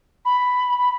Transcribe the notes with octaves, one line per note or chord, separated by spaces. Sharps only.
B5